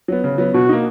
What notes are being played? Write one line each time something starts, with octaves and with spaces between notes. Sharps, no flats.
F#3 B3
C#3
F#3 B3
B2 F#4
A#3 D#4